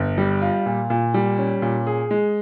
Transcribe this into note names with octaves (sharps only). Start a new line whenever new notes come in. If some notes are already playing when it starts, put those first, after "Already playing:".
Already playing: G1
G3
F4
A#2
A#2
G3
C#4
A#2
G#4
G#3